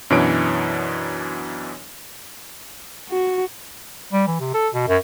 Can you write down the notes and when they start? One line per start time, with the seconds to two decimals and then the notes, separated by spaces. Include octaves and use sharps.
0.10 F#2 B2 E3 D4 C#5 D7
3.10 F#4
4.13 G3
4.27 E3
4.40 C3
4.54 A4
4.74 B2
4.88 F#2